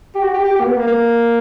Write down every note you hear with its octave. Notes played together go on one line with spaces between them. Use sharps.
G4
F#4
G4
G4
G4
A#3
B3
A#3
A#3